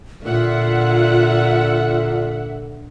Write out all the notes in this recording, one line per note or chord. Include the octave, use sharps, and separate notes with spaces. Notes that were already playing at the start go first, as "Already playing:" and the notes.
A#2 D3 F4 E5 F#5